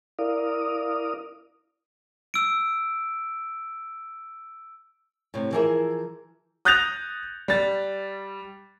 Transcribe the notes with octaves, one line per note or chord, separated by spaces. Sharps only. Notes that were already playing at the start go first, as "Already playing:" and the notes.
E4 A#4 D5 F5 D#6
E6 D7
A2 C3
E3 F3 E4 G#4 A#4 E5
D#6 F#6 G6 A6 A#6 F7
G3 A6